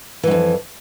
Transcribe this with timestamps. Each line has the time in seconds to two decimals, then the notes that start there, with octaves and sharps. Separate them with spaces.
0.23 E3
0.27 G#2
0.31 F2